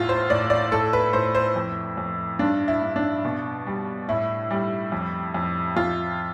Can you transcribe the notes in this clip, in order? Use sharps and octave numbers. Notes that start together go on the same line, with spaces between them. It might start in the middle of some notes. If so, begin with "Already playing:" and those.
Already playing: E2 A2 F4
C5
A2 D5
D5
A2 A4
B4
A2 C5
C5
F2
F2
G2 D4
E4
G2
D4
B2
G3
A2 E4
G3
F2
F2
F2 F4